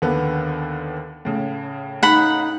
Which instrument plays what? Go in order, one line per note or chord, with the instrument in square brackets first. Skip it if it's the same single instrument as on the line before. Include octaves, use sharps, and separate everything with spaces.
[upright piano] D#2 D3 B3
A2 C#3
[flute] D#4 [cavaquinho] F#5 B5